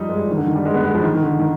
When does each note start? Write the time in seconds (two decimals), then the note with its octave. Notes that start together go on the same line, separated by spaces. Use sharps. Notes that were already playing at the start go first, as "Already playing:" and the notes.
Already playing: F3 G3 D#4
0.09 G#3
0.16 G3
0.24 F3
0.31 D#3
0.37 D3
0.47 D#3
0.56 G3
0.65 G#3
0.74 B3
0.83 G#3
0.94 F3
1.03 D#3
1.14 D#3
1.22 D3
1.39 D#3